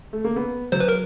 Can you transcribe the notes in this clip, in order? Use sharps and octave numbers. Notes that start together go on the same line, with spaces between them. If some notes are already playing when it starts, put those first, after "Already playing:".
A3
A#3
B3
F#3 C5
B4
A#4